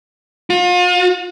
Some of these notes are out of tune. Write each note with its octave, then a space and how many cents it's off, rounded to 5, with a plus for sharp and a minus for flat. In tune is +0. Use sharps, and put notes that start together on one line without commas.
F4 +40